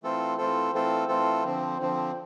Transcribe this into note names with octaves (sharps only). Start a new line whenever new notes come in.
E3 A3 C4 F4 A4
E3 A3 C4 F4 A4
E3 A3 C4 F4 A4
E3 A3 C4 F4 A4
D3 F3 C4
D3 F3 C4